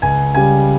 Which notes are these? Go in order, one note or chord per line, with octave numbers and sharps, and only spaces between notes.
C#2 G#5
C#3 G3 G#5